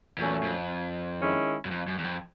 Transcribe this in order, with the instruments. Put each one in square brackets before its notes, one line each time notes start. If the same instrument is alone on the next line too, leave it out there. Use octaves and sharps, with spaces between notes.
[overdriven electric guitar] E2 [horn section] A#2 F#3 A3 C#4
[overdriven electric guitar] F2
[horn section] D#3 G#3 C#4 E4
[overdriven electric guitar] F#2
F2
F#2
E2
F2